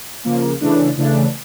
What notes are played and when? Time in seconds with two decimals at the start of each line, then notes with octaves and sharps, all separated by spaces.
0.25 C#3 F3 A#3
0.61 C#3 E3 A3 D4
0.97 C#3 E3 A3 D4